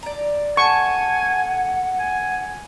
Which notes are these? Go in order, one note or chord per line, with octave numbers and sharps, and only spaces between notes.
D5 A#5
A4 F#5 G#5 A5 C#6
G#5